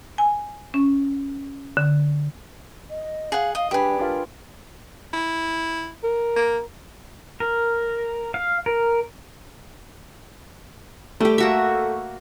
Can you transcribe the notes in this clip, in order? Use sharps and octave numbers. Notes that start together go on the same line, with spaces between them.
G#5
C#4
D3
D#5
G#4 F5 F#5
D#5 F5
G3 D4 G4 G#4 B4 B5
D4 F4 A#4
E4
A#4
A#3
A#4
F5
A#4
G3 A3 G4
A#3 F#4 E5